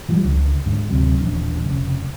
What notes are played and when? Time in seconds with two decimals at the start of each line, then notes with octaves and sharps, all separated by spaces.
0.09 E3 F3 G3 G#3
0.24 C#2 D3
0.66 G#2 D3
0.90 D2 C3 F#3
1.20 D#1 A1 F3 D4
1.65 F1 C#3